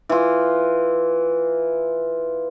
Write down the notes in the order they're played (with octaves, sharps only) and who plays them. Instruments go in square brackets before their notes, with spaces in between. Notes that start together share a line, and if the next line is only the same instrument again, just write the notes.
[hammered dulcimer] E3 F4